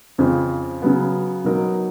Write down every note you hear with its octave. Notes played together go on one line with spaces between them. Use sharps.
F2 C#3 F3
C#3 F#3 B3
B2 F#3 B3 D#4 A#4